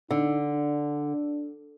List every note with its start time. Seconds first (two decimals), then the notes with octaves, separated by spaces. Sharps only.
0.11 D3 D#4
0.54 D4